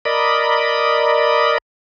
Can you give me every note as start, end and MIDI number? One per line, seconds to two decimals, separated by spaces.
0.05 1.58 70
0.05 1.58 74
0.05 1.58 75
0.05 1.58 83